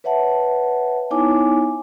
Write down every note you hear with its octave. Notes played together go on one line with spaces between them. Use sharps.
B4 C#5 E5 F#5 A5
B3 D#4 E4 C#5 G#5 D6